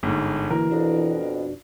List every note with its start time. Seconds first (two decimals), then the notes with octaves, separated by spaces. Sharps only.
0.03 G1 G#2
0.51 D3 E3 F#3 A#3 A#4
0.71 F2 B2 D4 F#4 D5